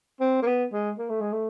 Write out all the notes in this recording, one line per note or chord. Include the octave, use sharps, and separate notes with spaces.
C4
A#3
B3
G#3
A#3
A3
G#3
A3